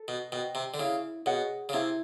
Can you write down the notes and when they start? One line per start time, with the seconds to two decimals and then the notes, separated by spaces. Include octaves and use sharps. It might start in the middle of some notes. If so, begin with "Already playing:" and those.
Already playing: A4
0.08 B2
0.32 B2 C5 D#5 G5
0.55 C3
0.74 D3
0.79 C#3 E4
1.26 B2 G#4 C#5 F#5
1.69 C#3
1.73 C3 E4